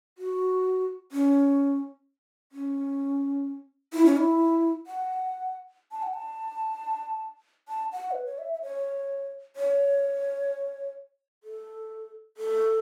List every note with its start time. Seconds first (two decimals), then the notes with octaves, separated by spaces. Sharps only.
0.18 F#4
1.12 C#4
2.52 C#4
3.93 E4
4.06 C#4
4.18 E4
4.87 F#5
5.91 A5
6.03 F#5
6.14 A5
7.68 A5
7.92 F#5
8.12 B4
8.26 C#5
8.38 E5
8.54 E5
8.62 C#5
9.56 C#5
11.44 A4
12.37 A4